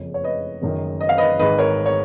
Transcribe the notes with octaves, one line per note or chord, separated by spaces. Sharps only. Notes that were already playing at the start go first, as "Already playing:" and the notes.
Already playing: F#1 F2 C#3
C#5
B4 D#5
F#1 F#2 D#3
D#5
F5
B4 D#5
G#1 G#2 D#3 B4 D#5
A#4 C#5
C#5